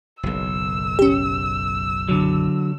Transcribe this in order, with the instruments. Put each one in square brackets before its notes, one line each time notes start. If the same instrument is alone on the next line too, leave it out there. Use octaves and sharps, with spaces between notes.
[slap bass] F#1 B1 [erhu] E6
[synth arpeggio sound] C#4 G4
[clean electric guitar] D3 F#3